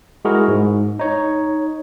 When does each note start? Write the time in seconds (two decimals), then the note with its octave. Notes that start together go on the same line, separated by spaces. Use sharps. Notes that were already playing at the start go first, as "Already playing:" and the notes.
0.25 G#3 E4 F#4 G#4 A#4
0.48 G#2
0.99 D#4 C#5